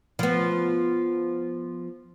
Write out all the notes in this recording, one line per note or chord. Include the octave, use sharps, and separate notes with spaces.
F3 B3